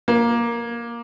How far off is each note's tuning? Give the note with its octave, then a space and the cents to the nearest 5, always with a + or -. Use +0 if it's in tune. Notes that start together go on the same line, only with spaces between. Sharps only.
A#3 +10